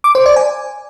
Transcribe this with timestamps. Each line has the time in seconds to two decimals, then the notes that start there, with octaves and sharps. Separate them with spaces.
0.04 D6
0.15 C5
0.26 D5
0.36 G#5